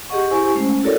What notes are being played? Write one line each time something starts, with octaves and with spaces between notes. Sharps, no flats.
G4 G#4 D#5 F#5 C#6
E4 G4 C5 G#5 C#6
G#3 A3 C#4 C5
E4 F#4 A4 A#4 C#5 D5